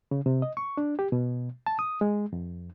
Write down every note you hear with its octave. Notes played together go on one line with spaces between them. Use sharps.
C#3
C3
D#5
C#6
D4
G4
B2
A5
D#6
G#3
F2